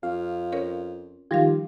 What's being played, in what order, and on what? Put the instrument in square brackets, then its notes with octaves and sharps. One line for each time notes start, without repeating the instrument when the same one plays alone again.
[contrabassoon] F2 [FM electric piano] F5
[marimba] C#4 A#4 C#5
[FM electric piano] D#3 F4 G4 [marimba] F3 G3 F5